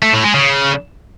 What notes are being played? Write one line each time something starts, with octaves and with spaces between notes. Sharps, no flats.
A3
A2
G#3
C#3